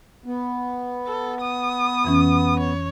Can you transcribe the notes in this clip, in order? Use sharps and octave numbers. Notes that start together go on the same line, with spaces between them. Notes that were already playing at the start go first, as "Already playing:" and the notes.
B3
A4
D#6
F2 E3 C#4
C#5